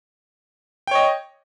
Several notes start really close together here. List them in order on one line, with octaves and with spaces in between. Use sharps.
G5 C#5 D#5